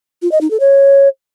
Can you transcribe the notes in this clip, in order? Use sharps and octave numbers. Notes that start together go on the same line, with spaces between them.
F4
D#5
D#4
A4
C#5